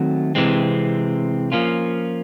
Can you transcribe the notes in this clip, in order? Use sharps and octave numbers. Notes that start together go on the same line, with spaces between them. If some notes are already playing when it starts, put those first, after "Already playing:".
Already playing: D#3 F#3 A3 C4
C3 E3 G#3 C4
F3 A#3 C#4 F4